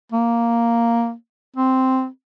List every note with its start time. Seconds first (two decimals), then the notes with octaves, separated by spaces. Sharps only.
0.12 A#3
1.56 C4